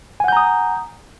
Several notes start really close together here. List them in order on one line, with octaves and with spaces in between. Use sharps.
G#5 F#5 G6 A#5 D#6